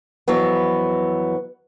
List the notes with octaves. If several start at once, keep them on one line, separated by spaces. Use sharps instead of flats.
F2 E3 F#3 B3